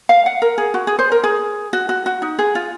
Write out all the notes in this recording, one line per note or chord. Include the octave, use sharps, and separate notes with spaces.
F5
F#5
A#4
G#4
F#4
G#4
C5
A#4
G#4
F#4
F#4
F#4
D#4
G#4
F4